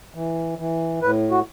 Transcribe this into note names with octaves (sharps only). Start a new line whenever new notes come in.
E3
E3
A2 B4
F#4